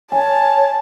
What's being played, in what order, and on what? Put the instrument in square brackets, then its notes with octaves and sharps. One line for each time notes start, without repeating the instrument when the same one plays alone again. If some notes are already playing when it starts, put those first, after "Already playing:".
[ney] C#5 [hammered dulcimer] G#5 [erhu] A5